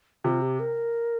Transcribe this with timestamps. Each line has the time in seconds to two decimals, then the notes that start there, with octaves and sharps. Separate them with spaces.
0.24 C3 F4
0.42 G4
0.60 A#4